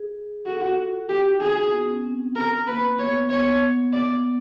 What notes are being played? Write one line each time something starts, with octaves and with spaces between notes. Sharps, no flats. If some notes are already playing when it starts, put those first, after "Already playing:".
Already playing: G#4
F#4 A4
F4
F#4
F#4 G4
F4
D#4
G#4
B3
C#4
C4
A#4
A#3 B4
B3 C#5
B3 C#5
D5